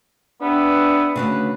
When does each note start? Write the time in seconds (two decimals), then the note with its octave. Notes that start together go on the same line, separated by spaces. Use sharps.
0.41 B3 D4 G4 B4 E5
1.16 D2 G2 C#3 B4